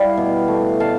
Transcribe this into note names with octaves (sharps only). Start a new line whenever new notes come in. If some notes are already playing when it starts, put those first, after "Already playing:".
Already playing: G3 E4 D5 F5 G5
B2
A3
B2 F5 A5